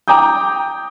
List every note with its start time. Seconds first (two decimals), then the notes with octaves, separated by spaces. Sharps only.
0.08 G5 A#5 D6 D#6 G6